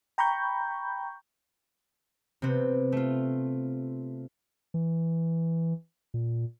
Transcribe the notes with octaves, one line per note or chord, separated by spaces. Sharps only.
G5 A#5 B5 C#6 G6
C3 B3 C4
A3 F4
E3
A#2